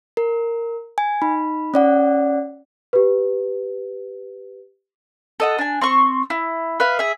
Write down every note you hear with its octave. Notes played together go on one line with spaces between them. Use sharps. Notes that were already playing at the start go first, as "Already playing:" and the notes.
A#4
G#5
D#4 B5
C#4 D5 F#5
G4 B4
A4 D#5 F#5
D4 G#5
C4 C6 C#6
E4
B4 E5 F5
G#4 E5